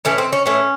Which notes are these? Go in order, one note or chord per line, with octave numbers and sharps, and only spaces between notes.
A2 E3 A3 C#4
C4
C#4
A2 E3 A3 C#4